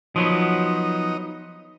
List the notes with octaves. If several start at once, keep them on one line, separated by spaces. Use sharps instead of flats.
F3 F#3 B3 D#4